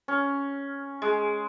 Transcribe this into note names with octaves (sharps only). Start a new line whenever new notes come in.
C#4
G#3